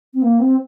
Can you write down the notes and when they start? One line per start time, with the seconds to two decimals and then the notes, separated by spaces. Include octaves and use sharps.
0.14 C4
0.22 A#3
0.40 C4